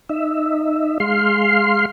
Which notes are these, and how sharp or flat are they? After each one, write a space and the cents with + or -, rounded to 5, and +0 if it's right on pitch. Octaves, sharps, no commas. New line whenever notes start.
D#4 -10 E5 +0
G#3 -5 F5 +0 C6 +0